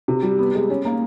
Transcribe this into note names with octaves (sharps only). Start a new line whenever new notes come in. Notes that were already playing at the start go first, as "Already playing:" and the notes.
C3
G3
B3
G#3
C#4
A#3